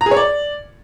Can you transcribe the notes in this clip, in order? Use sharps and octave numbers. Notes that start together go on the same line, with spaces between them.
A#5
G#4
C#5
D5